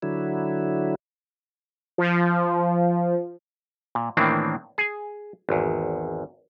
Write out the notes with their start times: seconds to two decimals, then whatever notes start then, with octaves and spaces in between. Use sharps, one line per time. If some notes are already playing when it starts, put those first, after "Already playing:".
0.03 D3 F#3 E4
1.98 F3
3.95 A#2
4.17 A2 D#3 E3 A#3 C4 D4
4.78 G#4 G#5
5.49 G#1 E2